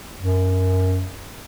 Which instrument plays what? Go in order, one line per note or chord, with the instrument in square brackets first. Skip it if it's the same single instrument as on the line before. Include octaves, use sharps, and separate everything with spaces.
[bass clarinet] F#2